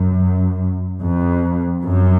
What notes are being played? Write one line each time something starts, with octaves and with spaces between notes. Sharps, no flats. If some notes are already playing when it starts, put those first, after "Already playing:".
Already playing: F#2
F2
F#2